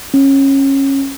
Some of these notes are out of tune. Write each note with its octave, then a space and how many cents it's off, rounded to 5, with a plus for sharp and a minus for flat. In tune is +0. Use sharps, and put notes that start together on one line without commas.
C#4 -20